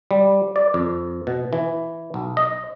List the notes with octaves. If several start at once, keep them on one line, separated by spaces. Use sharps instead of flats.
G3
D5
F2
B2
E3
B1
D#5